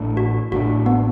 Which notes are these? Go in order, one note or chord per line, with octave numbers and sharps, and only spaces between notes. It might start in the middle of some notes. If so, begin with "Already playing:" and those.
Already playing: A1 A2 A3 D4
F#4
A1 A2 A3 D4 F#4
B3